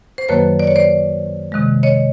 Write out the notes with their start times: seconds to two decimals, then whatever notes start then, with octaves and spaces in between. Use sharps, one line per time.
0.18 C5
0.29 F#2 D#3 F#3 A#3 B4 C#5
0.59 D5
0.67 C#5
0.76 C5 D5
1.52 C3 D#3 G#3
1.83 C#5 D#5